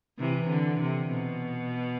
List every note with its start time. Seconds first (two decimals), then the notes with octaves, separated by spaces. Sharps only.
0.19 C3 E3
0.50 D3
0.81 C3
1.11 B2